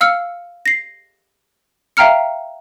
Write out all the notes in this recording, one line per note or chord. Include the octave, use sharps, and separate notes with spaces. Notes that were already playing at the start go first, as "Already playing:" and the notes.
F5 E6 F6 C#7
A#6 C7
E5 F5 G5 A#5 F6 C#7